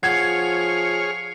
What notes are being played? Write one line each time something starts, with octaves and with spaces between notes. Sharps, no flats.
F3 G#4 C#5 F#5 F6 G#6 C7 C#7